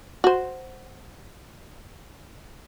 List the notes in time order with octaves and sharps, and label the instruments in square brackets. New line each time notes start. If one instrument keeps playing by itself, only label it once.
[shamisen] F#4 C5